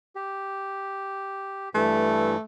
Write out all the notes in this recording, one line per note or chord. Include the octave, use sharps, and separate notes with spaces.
G4
G2 E3 A3